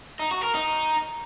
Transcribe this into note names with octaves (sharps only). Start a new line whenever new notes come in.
D#4
F#4
A#4
D#4